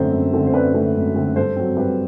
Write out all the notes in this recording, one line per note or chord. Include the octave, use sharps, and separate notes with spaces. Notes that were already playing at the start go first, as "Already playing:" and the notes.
Already playing: F#2 D3 A3 C4 C5 E5
F#2
D3 A3 C4
C5
F#2 B4 D5
D3 A3 C4
F#2
D3 A3 C4
G2 A4 C5
F#3 C4
G2 G4 B4